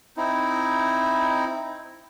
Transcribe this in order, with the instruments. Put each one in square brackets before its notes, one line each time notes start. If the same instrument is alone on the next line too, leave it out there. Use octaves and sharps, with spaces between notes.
[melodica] C4 D#4 E4